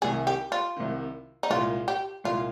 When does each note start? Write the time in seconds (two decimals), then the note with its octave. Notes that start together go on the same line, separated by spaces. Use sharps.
0.02 C2 C3 D#3 G#4
0.27 G4
0.52 F4
0.76 C2 C3 D#3
1.43 D#4
1.50 C2 A#2 G#3 F4
1.88 G4
2.24 C2 A#2 G#3 F4